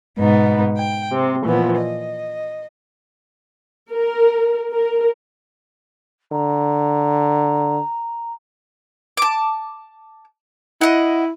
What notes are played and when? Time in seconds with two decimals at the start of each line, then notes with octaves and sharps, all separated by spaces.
0.18 G#2 B2 B3 D#4
0.78 G5
1.12 C3 C4
1.44 A#2 E3 F3 B3
1.78 D#5
3.91 A#4
4.72 A#4
6.32 D3 A#5
9.17 A5 D6
10.81 E4 D#5 F#5